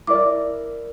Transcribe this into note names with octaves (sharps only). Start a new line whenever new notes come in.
E4 A#4 D5 D6